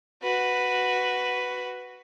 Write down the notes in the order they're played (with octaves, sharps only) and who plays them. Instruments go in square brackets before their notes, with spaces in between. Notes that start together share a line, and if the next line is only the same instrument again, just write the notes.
[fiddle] F#4 B4